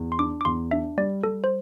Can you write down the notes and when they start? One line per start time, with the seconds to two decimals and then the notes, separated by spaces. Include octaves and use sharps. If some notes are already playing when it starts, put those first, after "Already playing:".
Already playing: E2
0.12 C6
0.19 D4 D6
0.41 D6
0.45 E2 C6
0.71 D4 E5
0.97 G3 D5
1.23 G3 A4
1.44 C5